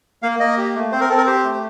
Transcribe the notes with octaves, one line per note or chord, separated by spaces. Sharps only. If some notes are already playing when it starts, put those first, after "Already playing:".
A#3 F5
A#3 D#5
G4
A3
C4 C5
A#4
C4 A4
A#4
G4 C5
A3